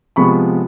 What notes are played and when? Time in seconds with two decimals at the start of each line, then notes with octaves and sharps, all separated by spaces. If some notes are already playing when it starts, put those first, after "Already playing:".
0.16 C3 F3 G#3 B3 B5 C#6